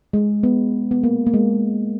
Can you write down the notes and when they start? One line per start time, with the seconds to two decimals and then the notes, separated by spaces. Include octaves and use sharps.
0.13 G#3
0.43 B3
0.91 B3
1.03 A#3
1.27 A#3
1.34 G#3